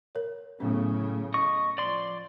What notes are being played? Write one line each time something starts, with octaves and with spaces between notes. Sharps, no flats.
A#4 C#5
A2 C#3 F#3 B3 C#4
D#5 C#6
F3 D5 C6